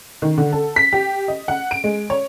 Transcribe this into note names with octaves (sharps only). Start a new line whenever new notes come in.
D#3
D3
A4
B6
G4
D#5
F#5
D7
G#3
C#5